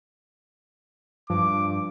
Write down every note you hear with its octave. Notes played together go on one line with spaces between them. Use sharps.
G2 F3 D6